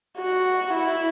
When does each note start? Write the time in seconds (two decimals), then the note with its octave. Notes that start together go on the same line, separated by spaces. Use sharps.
0.18 F#4
0.73 E4